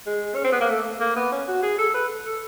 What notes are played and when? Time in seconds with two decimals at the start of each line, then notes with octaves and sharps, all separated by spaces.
0.06 G#3
0.35 C#4
0.44 C4
0.52 B3
0.61 A#3
0.69 A3
1.00 A#3
1.16 B3
1.32 C#4
1.48 F#4
1.63 G#4
1.79 A4
1.94 B4
2.26 A4